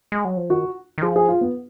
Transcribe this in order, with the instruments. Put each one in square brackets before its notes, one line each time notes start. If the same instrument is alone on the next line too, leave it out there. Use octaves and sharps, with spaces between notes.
[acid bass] G#3
F#3
F3
[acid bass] D#3 [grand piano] F#4
[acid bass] D#3
[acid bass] F3 [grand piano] G#4
[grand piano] G#4
F4
B3